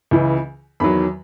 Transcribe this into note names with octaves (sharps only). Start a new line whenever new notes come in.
C#2 C#3 E3
E2 D#3 F#3 B5